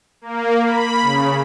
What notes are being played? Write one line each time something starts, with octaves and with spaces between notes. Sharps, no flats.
A#3
B5
C#3